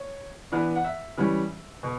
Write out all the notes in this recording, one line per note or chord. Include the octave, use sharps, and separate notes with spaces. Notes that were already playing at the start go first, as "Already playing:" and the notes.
Already playing: C#5
E3 B3 D4
F#5
E5
E3 G3 C#4
B2